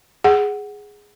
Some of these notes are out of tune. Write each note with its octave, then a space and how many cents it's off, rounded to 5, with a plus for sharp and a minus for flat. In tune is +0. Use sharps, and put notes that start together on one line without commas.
G#4 +0 F#5 +5